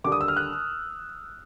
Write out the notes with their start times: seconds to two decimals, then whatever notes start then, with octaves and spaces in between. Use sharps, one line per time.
0.04 D#2 D3 G3 D6
0.12 D#6
0.21 E6
0.28 F6
0.37 F#6